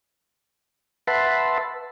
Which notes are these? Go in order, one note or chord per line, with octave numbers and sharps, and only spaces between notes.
B4 E5 F#5 A5 B5 C6